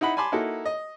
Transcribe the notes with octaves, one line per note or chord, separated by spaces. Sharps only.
D#4 E4 F#5 B5
G#5 A5 B5 C6 D6
A#3 D#4 E4 F#4 A4
D#5